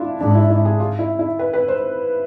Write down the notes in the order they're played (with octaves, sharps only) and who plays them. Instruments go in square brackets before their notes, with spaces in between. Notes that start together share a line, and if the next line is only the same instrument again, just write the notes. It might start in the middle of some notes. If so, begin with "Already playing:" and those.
Already playing: [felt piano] D4 E4 F4
[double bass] G#2 [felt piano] D4
[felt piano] E4
E4
G#4
F4
E4
E4
B4
B4
C5